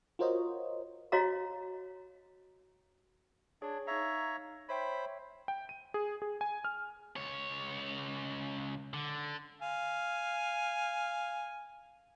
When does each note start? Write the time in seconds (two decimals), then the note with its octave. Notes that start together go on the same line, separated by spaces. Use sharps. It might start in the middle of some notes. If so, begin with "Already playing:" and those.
0.19 F4 F#4 A#4 C5 C#5 D#5
1.12 F#4 C#5 D#5 F5 A#5
3.62 D4 G#4 C#5 G#6
3.87 D#4 C#5 E5 F5 A#5
4.69 C5 C#5 E5 G5 B5
5.48 G5
5.69 D#7
5.94 G#4
6.22 G#4
6.41 G#5
6.65 F6
7.16 C#2 C#5
8.94 D3
9.62 F5 G#5